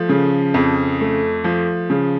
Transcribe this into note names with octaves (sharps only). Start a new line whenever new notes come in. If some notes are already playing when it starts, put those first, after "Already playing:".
Already playing: F3 A3
C#3
F2
A3
F3
C#3